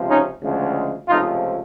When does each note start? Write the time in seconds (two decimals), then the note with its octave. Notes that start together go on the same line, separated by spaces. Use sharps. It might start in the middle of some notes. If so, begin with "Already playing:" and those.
Already playing: C#2 C3 F3
0.09 C#4 D#4
0.42 D2 C#3 F3 G#3
1.08 C#2 C3 F3 A3 D#4 F4